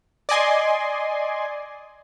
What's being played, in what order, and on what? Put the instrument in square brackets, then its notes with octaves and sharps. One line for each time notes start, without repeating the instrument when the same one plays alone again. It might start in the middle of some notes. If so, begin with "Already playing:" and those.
[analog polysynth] D5 D#5 G#5 C6